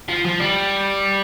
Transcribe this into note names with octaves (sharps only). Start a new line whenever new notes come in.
F3
F3
G3